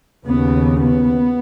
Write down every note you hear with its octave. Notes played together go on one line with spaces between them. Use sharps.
D#2 C#3 B3
B3